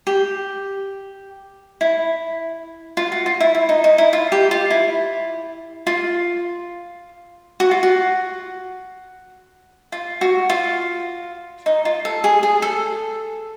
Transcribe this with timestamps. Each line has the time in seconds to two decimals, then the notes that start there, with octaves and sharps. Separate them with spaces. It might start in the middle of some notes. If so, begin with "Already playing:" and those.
0.07 G4
1.81 E4
2.97 F4
3.12 F#4
3.26 F4
3.40 E4
3.55 E4
3.69 D#4
3.84 D#4
3.98 E4
4.13 F4
4.32 G4
4.51 F4
4.71 E4
5.87 F4
7.60 F#4
7.71 F4
7.83 F#4
9.92 F4
10.21 F#4
10.50 F4
11.66 D#4
11.85 F4
12.05 A4
12.24 G#4
12.43 G#4
12.62 A4